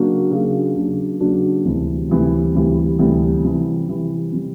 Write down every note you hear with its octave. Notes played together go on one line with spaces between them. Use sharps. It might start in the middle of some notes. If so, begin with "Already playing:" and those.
Already playing: C#3 F#3 A#3 D4 F#4
C#3 F#3 A#3 D4 F#4
C#3 F#3 A#3 D4 F#4
C#3 F#3 A#3 D4 F#4
D2 C3 E3 G3
D2 C3 E3 G3
D2 C3 E3 G3
D2 C3 E3 G3
C3 E3 G3
C3 E3 G3
C3 E3 G3